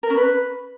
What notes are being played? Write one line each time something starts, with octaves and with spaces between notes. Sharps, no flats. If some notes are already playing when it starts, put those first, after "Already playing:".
A#4
C#4
B4